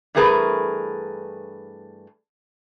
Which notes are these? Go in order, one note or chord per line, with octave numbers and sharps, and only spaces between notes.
G2 E3 A3 G#4 A#4 B4